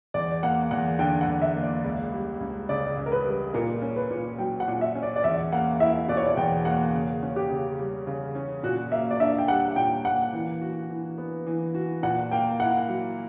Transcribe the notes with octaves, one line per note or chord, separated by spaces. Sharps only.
E2 D5
A#3 F#5
E2 F#5
D3 G5
F#5
E2
E5
A#3
D5
C#2
G3
C#2
C#3 D5
C#2
A#4
B4
G3
A#2 A#4
C#4
B4
A#2
F#3 G5
F#5
A#2
E5
C#4
D5
D5
E2 E5
A#3 F#5
E4 E5
B2 D5
C#5
D5
E2 G5
A#3 F#5
C#3
C#4
G4
C#3
G3
C#3
C#4
A#2 F#4
A#3 E5
D5
D4 E5
G5
G3 F#5
A#2 G5
A#3 F#5
E3
F#4
E3
B3
E3
F#4
A#2 F#5
A#3 G5
E4 F#5
F#3